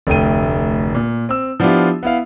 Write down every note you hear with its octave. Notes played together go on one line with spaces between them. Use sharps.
F1 D2 A3 G5 D#7
A#2
C4 E6
F3 B3 D4 E4 F4 G4
B3 E4 F5